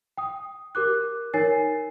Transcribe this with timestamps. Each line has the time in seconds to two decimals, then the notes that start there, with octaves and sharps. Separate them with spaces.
0.17 G5 D#6
0.75 G4 A#4 D6 F#6
1.34 D#4 A#4 C#5 G#5 A6 C7